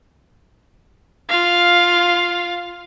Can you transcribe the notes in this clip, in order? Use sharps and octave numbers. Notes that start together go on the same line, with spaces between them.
F4 F5